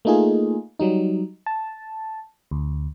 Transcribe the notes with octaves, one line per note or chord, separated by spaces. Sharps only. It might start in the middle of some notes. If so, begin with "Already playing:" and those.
A3 A#3 D#4 F4 G#4
F#3 G3 D#4
A5
D2